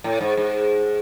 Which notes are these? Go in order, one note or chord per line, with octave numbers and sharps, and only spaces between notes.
A2
G#2
G#2